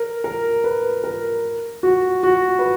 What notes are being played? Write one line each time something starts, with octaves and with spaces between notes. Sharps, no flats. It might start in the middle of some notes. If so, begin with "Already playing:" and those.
Already playing: A#4
A#4
B4
A#4
F#4
F#4
B4